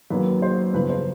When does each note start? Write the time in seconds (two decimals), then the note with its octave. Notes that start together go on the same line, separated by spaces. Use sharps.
0.10 F#2 D#3 F#3 A#3 B4
0.42 C5
0.73 G1 F2 C#3 F3 B4
0.90 C5